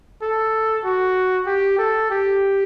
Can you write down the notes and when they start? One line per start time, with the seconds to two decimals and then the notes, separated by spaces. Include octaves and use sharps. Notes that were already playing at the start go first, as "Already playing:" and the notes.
0.22 A4
0.85 F#4
1.47 G4
1.79 A4
2.11 G4